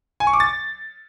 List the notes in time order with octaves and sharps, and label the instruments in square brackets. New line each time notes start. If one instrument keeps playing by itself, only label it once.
[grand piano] G#5
C#6
D6
A6